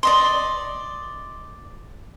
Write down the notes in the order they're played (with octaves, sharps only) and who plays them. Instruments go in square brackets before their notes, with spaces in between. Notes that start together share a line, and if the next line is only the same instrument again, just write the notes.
[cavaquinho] D5 D#5 C6